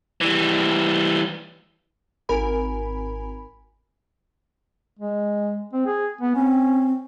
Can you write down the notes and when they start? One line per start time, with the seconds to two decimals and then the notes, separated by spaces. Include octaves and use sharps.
0.21 E3 G3
2.29 G#1 A#4 G#5 B5
4.99 G#3
5.73 C4
5.86 G#4
6.21 B3
6.35 C4 C#4